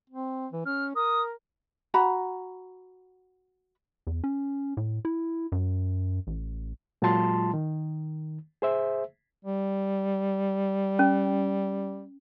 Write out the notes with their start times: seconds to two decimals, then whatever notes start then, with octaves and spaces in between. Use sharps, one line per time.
0.10 C4
0.52 E3
0.66 C#4 F6
0.96 A#4 D#6
1.94 F#4 A#5 B5
4.07 E2
4.24 C#4
4.77 A2
5.05 E4
5.52 F#2
6.27 A1
7.02 A#2 F#3 G#3 F4 A5 C6
7.53 D#3
8.62 G#4 C5 E5
9.44 G3
10.99 C#4